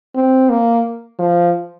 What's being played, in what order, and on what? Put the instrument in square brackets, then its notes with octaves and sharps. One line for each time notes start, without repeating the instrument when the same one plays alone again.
[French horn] C4
A#3
F3